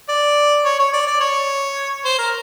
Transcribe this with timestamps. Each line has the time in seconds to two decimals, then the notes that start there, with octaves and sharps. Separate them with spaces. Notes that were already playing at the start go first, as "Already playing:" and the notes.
0.09 D5
0.65 C#5
0.79 C#5
0.93 D5
1.07 D5
1.20 C#5
2.05 C5
2.18 A#4